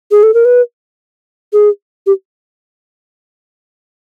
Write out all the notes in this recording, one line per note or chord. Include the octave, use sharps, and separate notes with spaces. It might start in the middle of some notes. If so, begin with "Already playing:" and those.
G#4
A4
A#4
B4
G#4
G4